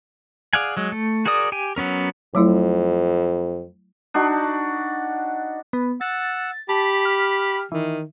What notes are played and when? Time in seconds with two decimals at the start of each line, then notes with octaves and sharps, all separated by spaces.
0.53 G#4 D5 F5 F#5 G#5
0.77 F#3 G#3
0.92 A3
1.25 F#4 G#4 A#4 D5 D#6
1.52 G4 G5 G#5
1.76 F#3 B3 C#4 A#4
2.35 F2 F#3 A3 E4
4.14 D4 D#4 F#4
5.73 B3
6.01 F#5 E6 A6
6.69 G4 A5 B5
7.05 F6
7.72 D#3 E3